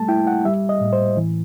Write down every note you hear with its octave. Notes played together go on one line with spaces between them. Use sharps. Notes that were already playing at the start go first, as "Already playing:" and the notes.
Already playing: G3 A3 A5
E4 G5
F#5
G3 E5
D#5
A2
C5
E3